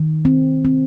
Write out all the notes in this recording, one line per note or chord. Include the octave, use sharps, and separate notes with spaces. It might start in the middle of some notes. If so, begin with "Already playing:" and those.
Already playing: D#3
C4
C4